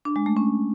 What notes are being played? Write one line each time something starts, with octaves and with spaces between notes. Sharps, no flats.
D4
G#3
A3
C#4